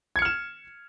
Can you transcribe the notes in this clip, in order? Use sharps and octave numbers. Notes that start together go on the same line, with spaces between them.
F6 G#6 C#7 E7